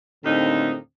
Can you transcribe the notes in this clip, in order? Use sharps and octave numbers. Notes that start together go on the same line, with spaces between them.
D#2 A2 D3 C4 D#4